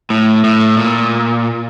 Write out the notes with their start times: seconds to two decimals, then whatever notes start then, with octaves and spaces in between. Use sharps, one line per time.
0.10 A2
0.44 A2
0.77 A#2